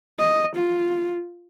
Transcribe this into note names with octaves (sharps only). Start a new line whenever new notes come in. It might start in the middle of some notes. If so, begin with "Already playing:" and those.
D#5
F4